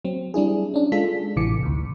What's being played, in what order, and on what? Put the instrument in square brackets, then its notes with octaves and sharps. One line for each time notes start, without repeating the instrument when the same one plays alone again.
[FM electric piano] F#3 C4
G3 D4 E4 G#4
C#4 D4
G#3 F4 A4 B6
A1 C3 E3 D6 C#7
D2 G#2